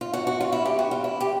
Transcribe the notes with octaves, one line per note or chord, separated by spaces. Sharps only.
F4
F#4
F#4
F4
E4
G4
F#4
F4
E4
G4